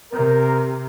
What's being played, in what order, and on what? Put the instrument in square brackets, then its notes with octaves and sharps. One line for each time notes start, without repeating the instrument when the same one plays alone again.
[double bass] C3 [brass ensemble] A#4